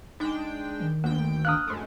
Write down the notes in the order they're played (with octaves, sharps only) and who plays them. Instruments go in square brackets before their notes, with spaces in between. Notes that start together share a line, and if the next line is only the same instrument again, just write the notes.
[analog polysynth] G#3 D4 G5 [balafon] D#4
[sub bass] D#3
[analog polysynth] D2 G5 [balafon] A#3
[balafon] D4 F5 [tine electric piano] D#6 F6 F#6
[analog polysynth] F#2 G#3 A3